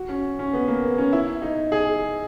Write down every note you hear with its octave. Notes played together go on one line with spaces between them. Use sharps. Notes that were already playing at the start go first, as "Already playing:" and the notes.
Already playing: F#4
C#4
C#4
B3
A#3
B3
C#4
E4
D#4
G#4